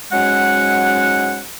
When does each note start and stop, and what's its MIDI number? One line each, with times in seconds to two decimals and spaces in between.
0.13 1.42 44
0.13 1.42 54
0.13 1.42 56
0.13 1.42 61
0.13 1.42 78